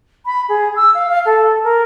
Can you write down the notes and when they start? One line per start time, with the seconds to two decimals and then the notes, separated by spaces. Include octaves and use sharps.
0.25 B5
0.48 G#4
0.75 E6
0.94 F5
1.09 F5
1.25 A4
1.64 A#4